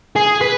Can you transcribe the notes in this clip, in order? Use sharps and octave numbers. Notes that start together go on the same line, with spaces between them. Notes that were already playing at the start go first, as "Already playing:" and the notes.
G#4
B4